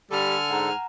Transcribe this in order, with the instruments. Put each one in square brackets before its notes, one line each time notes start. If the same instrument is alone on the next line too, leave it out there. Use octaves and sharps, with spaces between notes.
[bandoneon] D3 A4 [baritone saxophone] G3 [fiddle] G#5 F6
[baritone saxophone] G#2 [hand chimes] F#5 A#5